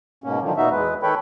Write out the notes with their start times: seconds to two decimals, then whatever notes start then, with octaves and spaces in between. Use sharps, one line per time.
0.24 G#2 B2 A#3 C#4
0.42 D3 D#3 F3 F#3
0.57 A#2 B3 D#4 F#4 E5
0.71 E2 G#3 B3 B4
1.03 D#3 A4 B4 C#5 G5 B5